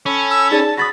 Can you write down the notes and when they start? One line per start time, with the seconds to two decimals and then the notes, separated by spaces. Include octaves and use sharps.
0.06 C#4 A4 B5
0.31 E6
0.51 D#4 G#4 D5 A5
0.77 F#4 B5 D#6 A6 A#6